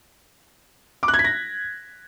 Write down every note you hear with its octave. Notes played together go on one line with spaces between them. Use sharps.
D6
F#6
G#6
B6
A#6